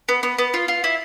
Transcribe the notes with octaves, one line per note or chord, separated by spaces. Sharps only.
B3
B3
B3
F4
F4
E4